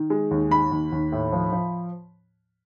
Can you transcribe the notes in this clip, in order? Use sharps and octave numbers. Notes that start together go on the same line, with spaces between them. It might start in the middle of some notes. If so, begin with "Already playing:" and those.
Already playing: D#3
G#3
D#2
D#3 B5
D#2
D#2
A2
F3
F3